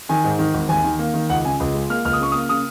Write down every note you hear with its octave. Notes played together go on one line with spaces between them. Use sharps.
D#3 G#5
G#2
D#3
G#1
D#2 G#5
D#3
A#3
D#3
C#2 F#5
C#3 G#5
C#2
G#3
A#3 F6
C#2 F6
D#6
C#3 C#6
D#6
A#3
C#3 D#6